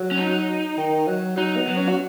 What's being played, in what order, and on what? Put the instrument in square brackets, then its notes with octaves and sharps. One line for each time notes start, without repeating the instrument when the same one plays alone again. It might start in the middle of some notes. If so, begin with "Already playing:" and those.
Already playing: [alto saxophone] F#3
[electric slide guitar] C#4
D#4
[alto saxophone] D#3
F#3
[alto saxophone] F#3 [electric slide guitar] D#4
[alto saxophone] B3
[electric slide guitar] F#3
[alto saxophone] C#4
F#4